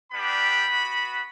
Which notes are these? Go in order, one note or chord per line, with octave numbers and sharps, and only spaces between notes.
G3 B3 D4 G4 B5
B3
F#4